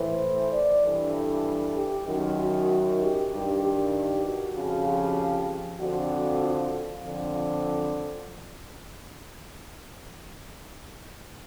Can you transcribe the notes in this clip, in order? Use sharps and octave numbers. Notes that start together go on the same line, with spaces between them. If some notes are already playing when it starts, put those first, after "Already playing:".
Already playing: A2 E3 C5
D5
G2 E3 A4
G4
F#2 D#3 F#4
F#4
G4
G2 D#3
G4
F#4
F2 C#3 F3
G4
F2 D3 F3 F#4
F4
F2 D3 F3